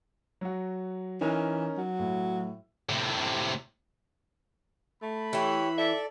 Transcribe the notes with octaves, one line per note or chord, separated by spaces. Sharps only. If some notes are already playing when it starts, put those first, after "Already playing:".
F#3 F#4
E3 C#4 D#4 A#4
F#3
A2
A2 C3
A3 B5
E3 E4 G4 C#5
A4 D5 E5